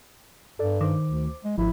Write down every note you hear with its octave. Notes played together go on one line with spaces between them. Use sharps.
G2 A4 D5
D#3 C5 D6
D2
G#3
G#1 F3 E4